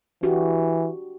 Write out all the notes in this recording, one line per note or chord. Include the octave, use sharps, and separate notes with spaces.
E3 D4 F#4 G4